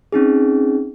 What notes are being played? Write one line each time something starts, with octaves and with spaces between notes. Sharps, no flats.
C4 C#4 D#4 G#4